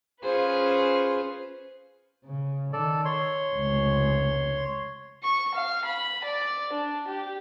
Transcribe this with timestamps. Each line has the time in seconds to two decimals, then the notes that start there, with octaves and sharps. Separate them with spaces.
0.22 C#4 F4 G#4 B4 C5
2.25 C#3
2.73 D#3 A4 D5
3.05 C#5 C6
3.50 F1 C#2
5.23 C#6
5.54 F5
5.85 B5
6.24 D5
6.72 D4
7.07 G4